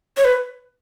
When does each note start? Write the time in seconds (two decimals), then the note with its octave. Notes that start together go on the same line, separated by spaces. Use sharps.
0.17 C#5
0.24 B4